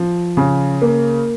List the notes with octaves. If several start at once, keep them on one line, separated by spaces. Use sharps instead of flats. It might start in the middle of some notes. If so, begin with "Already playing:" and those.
Already playing: F3
C#3
A#3